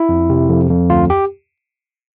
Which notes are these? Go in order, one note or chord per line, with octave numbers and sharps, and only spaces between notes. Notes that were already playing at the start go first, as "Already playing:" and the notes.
Already playing: E4
F2
C3
F2
F2
D2 F4
G4